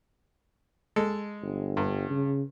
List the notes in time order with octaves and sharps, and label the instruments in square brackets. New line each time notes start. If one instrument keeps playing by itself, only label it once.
[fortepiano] G#3 A4
[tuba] G1
[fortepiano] G2
[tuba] C#3